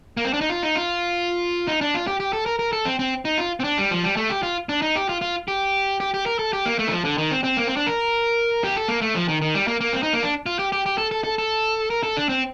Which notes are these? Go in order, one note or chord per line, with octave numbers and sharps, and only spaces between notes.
A#3
C4
D4
D#4
F4
D#4
F4
D#4
D4
F4
G4
G4
A4
A#4
A#4
A4
C4
C4
D#4
F4
C4
D4
G3
F3
G3
A3
G4
F4
D4
D#4
G4
F4
F4
G4
G4
G4
A#4
A4
G4
A#3
A3
D#3
F3
D3
D#3
C4
C4
A#3
C4
D4
A#4
G4
A4
A#3
A3
F3
D#3
D#3
G3
A#3
A#3
C4
D#4
A#3
D4
F4
G4
G4
G4
A4
A4
A4
A4
A#4
A4
D4
C4